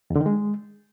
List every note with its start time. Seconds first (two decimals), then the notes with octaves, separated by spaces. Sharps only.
0.10 E2
0.16 D3
0.21 D#3
0.26 G#3